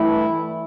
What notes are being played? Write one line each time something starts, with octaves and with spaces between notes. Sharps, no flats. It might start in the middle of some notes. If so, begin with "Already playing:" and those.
Already playing: G2 E3 A3 E4